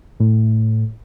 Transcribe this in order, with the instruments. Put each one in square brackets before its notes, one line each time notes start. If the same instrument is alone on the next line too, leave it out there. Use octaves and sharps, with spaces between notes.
[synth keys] A2